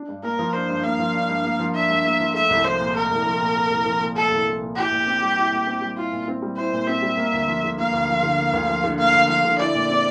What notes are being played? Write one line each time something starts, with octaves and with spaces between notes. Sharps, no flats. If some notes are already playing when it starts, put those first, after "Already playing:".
Already playing: D4
G2
A#3 A#4
F3
D4 C5
G2
A#3 F5
F3
D4
G2
A#3
F3
D4 E5
G2
A#3
F3
A3 E5
C2
F3 C5
A#2
A3 A#4
C2
F3
A#2
A3
C2
F3
A#2
A3 A4
C2
F3
A#2
E4 G4
A#2
C4
G3
E4
A#2
C4
G3
E4 F4
A#2
C4
G3
E4 C5
A#2
C4 E5
G3
A#3
D2
F3
D3
A#3 F5
D2
F3
D3
A#3
D2
F3
D3
A#3 F5
D2
F3 F5
D3
E4 D5
A#2
C4